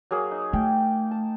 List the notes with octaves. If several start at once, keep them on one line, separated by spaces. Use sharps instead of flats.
F#3 A#3 G#4
D#4
A3 G5
A5